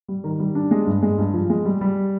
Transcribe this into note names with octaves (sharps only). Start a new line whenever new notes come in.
G3
D#3
G3
D4
G#3
G2
G#3
G2
F3
G#3
G3
G3